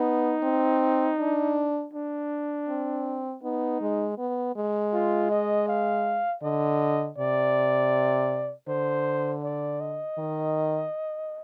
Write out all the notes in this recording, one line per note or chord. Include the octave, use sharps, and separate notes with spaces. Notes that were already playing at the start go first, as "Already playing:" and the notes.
Already playing: B3 D#4
C4
D4
D4
C4
B3 D#4
G#3
B3
G#3
F4
D#5
F5
D3 D#5
C3 D5
D3 C5
D5
D#5
D#3